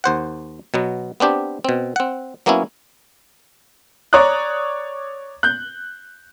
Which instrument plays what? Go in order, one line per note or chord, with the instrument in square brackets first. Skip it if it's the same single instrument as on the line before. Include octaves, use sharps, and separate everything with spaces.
[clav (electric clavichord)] D#2 C5 F#5
B2 F#3 B3
B3 C4 D4 G4
B2 C4
C4 F#5
F#3 A#3 B3 C#4 E4
[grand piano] C#5 D5 A#5 D6 D#6 F#6
F#6 G6